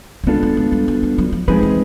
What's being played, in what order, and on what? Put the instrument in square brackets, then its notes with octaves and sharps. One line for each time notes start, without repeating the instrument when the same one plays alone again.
[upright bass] G3
[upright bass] G#3 [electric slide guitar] B3 D4 F4 A4
[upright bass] G3
G#3
G3
F#3
G3
F#3
F3
[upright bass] F3 [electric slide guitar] G#3 C4 D#4 G#4 B4
[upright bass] E3